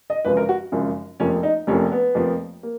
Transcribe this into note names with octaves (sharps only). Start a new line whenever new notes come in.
D#5
G#1 F#2 C#3 F3 B4
A#4
F#4
G#1 F#2 C#3 F3
F1 F2 F3 A#3 C#4
D#4
F1 F2 F3 A#3 C#4
B3
F1 F2 F3 A#3
A#3